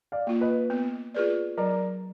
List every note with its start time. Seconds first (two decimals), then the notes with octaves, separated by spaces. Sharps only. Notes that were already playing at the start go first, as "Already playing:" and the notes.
0.12 D5 F5
0.27 A#3 F4
0.41 B4 D#5
0.70 B3
1.14 F4 G#4 B4 D5
1.57 F#3 A#4 D5